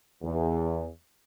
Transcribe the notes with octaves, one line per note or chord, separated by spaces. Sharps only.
E2